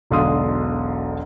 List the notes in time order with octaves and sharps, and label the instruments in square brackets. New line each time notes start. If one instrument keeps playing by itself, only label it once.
[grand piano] E1 B1 D3 F5 C6 D#6